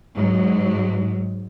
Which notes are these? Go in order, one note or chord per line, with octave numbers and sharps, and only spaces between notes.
G#2 F#3